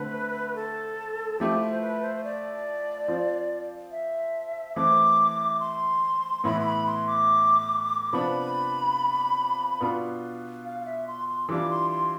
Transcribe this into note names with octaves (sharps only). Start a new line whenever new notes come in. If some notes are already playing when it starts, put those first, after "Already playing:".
Already playing: D3 A3 C4 B4
A4
F3 A3 E4 G4
F4
C5
B4
C5
C5
D5
F3 C4 F4
E5
E3 A3 C4 E4 D6
C6
A2 E3 B3 E4 B5
C6
B5
C6
D6
C3 F3 B3 D4 B5
B2 B3 D4 F4
F5
F5
E5
C6
C6
E3 G3 D4 F4 D6
C6
C6